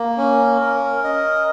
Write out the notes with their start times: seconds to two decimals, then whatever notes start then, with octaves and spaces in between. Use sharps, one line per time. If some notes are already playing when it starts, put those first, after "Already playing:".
Already playing: A#3
0.17 C#4
0.60 A#4
1.04 D#5